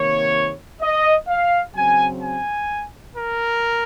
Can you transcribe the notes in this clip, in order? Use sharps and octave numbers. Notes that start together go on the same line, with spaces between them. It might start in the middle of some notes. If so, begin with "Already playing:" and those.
Already playing: C3 D#3 A#3 C#5
D#5
F5
C#3 F#3 C4 G#5
G#5
A#4